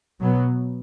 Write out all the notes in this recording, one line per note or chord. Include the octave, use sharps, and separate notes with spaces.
B2 F#3 B3